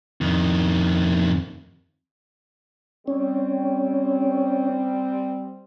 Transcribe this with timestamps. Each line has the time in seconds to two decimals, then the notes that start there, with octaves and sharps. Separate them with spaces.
0.21 F2 D#3
3.08 G3 C4 C#4